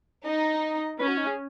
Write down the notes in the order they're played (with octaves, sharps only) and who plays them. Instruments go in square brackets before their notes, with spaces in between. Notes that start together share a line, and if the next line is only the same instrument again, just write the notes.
[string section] D#4 [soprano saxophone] D#5
[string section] C#4 [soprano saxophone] B4
[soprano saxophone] F#4
D#4
G#4